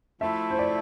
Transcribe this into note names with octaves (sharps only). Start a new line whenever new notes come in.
F3 A3 E4 E5
C5
D5